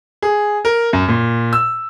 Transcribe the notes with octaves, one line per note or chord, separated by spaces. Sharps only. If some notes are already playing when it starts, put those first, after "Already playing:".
G#4
A#4
F#2
A#2
E6